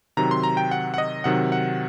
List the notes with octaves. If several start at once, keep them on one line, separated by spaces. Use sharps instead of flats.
C3 D#3 F#3 A#5
C6
A#5
G5
F#5
F#5
D#5
C3 D#3 F#3 F#5
F#5